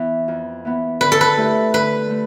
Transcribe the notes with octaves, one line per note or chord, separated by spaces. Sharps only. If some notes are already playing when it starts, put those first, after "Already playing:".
Already playing: E3 B3
F2
E3 B3
D3 B4
A4
B4
A3 E4 G4 D5
D3 B4
A3